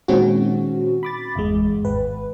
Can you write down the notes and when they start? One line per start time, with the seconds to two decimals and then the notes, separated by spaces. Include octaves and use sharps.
0.08 A#2 D#3 G#3 C4 C#4 F#4
1.03 B5 D6 A6
1.35 G1 E2 G#3
1.84 G#1 B4